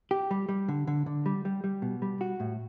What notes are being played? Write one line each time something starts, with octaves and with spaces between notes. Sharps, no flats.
G4
G3
G3
D3
D3
D3
G3
G3
G3
B2
G3
F#4
A2